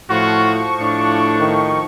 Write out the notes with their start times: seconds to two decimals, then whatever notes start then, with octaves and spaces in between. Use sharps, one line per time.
0.10 A2 F3 F4 F#4 C#6
0.79 A2 D4
1.39 D#3